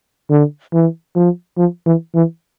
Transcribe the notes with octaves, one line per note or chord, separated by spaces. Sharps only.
D3
E3
F3
F3
E3
E3